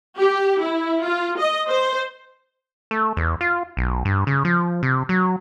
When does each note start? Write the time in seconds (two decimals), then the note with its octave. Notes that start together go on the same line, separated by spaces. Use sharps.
0.19 G4
0.62 E4
1.04 F4
1.38 D#5
1.68 C5
2.91 A3
3.17 E2
3.41 F4
3.77 B1
4.05 G2
4.27 C#3
4.45 F3
4.83 C3
5.09 F#3